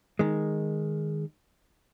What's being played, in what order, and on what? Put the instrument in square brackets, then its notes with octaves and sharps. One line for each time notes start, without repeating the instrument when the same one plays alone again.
[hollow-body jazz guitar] D#3 G#3